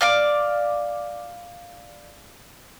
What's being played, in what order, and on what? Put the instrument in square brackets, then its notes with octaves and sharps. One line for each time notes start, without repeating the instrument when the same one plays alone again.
[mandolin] D5 F5 D6